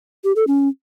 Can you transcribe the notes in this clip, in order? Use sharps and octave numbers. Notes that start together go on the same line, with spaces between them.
G4
A4
C#4